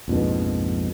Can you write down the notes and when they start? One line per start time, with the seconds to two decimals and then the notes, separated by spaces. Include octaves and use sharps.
0.08 A#1 F2 G#2 B2